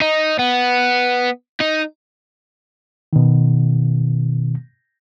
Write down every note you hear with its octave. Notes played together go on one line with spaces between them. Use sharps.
D#4
B3
D#4
B2 D#3